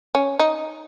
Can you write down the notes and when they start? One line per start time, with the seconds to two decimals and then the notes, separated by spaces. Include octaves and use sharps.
0.15 C#4
0.39 D#4